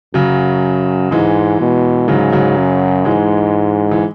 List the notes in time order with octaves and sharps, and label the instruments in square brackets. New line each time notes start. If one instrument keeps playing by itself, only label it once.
[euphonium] F#2 [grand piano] C#3 F#3
[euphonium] G#2 [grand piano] E3 G#3
[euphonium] B2
[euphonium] G#2 [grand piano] C#3 F#3
[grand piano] C#3 F#3
[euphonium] F#2
[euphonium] G#2 [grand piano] E3 G#3
[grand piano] E3